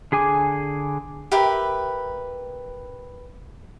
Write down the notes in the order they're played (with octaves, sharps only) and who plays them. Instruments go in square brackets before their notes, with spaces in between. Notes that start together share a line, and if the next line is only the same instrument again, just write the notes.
[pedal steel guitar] D3 G#4 G#5 D6
[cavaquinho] G4 A#4 B4 E5